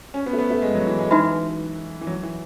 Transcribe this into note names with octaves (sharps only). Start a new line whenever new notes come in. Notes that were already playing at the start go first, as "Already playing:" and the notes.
C#4
B3
A3
B3
A3
G#3
F#3
E3
G#3
E3 D#4 F#4 B4 E5 B5
E3
F#3
E3